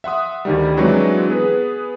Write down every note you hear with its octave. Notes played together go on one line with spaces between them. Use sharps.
E5 F#5 C6 D#6
D2 D#3 G3
E3 F#3 G#3 C4 D4 F#4
B3 G#4 B4